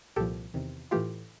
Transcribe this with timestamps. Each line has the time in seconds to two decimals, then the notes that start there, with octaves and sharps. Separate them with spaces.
0.16 C2 A#2 F3 G4 A4
0.54 E2 C3 D#3
0.91 A2 E3 A3 F4 G4